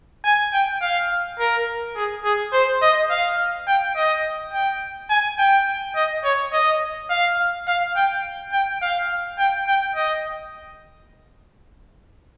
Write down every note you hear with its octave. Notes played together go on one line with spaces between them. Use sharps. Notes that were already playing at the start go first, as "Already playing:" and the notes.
G#5
G5
F5
A#4
G#4
G#4
C5
D#5
F5
G5
D#5
G5
G#5
G5
D#5
C#5
D#5
F5
F5
G5
G5
F5
G5
G5
D#5